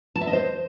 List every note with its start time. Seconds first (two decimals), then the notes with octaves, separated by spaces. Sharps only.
0.16 A5
0.21 E5
0.27 D#5
0.33 C5